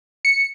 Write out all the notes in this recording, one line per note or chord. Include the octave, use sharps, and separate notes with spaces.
C#7